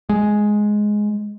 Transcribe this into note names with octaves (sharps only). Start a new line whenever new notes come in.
G#3